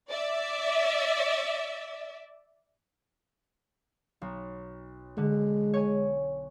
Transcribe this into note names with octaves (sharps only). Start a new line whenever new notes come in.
D5 E5
B1
D3 G#3
C#5 G#5